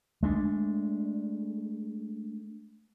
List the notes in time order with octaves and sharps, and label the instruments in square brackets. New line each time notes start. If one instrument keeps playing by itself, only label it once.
[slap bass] G#3 A3 D4